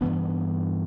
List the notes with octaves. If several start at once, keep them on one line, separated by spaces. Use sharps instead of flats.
G2 E3 B3 D4